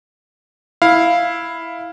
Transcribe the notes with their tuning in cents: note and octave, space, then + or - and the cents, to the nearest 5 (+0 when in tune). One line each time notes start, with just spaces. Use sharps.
E4 +0 F5 +0